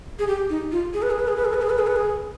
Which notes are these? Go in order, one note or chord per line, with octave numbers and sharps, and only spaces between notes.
G#4
G4
D#4
F4
G#4
B4
G#4
B4
G#4
B4
G#4
B4
G#4
B4
G#4
B4
G#4